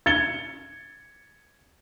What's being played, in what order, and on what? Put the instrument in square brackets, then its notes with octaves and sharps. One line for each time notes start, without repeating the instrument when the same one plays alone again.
[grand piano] G#6 A6 C#7 G7